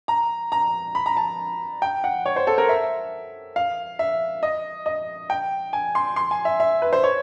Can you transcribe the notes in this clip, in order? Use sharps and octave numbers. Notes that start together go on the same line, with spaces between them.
A#5
A#5
B5
A#5
A5
G5
F#5
C#5
C5
A4
A#4
E5
F5
E5
D#5
D#5
G5
G#5
C6
C6
G#5
E5
E5
B4
C5
C#5